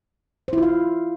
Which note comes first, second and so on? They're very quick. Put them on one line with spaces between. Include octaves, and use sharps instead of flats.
C5 E4 F4 F5